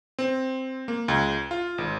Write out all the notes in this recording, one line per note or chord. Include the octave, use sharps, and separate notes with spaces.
C4
A#3
C#2
F4
G#1